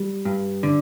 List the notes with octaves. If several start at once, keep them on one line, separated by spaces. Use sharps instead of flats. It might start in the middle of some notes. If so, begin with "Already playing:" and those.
Already playing: G3
G2
D3